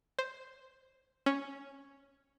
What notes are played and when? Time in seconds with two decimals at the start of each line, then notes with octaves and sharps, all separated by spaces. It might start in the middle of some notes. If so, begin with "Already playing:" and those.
0.19 C5
1.26 C#4